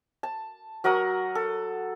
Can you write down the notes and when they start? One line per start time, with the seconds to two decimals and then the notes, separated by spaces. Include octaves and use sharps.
0.23 A5
0.84 F#3 A#4 F#5 D#6
1.35 A4